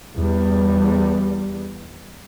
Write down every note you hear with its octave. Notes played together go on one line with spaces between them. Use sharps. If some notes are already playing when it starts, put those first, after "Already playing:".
E2 G3